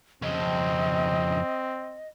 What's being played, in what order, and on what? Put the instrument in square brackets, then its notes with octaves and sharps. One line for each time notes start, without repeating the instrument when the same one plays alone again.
[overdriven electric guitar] F2 C#3 [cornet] C4 [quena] D#5